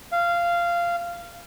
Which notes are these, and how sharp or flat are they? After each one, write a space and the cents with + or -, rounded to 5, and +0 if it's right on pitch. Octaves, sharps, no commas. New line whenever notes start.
F5 -15